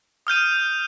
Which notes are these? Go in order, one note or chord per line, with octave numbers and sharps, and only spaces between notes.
D#6 F6 G6 D#7